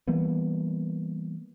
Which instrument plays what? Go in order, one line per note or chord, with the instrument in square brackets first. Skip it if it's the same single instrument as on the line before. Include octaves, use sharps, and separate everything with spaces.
[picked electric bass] E3 G3 A#3 B3